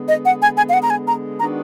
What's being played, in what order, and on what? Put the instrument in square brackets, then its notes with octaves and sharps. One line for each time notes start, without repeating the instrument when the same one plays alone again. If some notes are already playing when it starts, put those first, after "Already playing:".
Already playing: [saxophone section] D3 G#3 B3
[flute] D#5
F#5
G#5
G#5
F5
F#5
A#5
G#5
A#5
[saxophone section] D#3 G#3 B3 D4 F#4 [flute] A#5